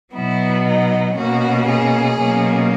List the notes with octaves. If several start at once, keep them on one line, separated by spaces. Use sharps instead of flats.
B2 F#3 B3 E4
D#4
B2 A#3 C#4 F#4
G#4
B2 F#3 A#3 C#4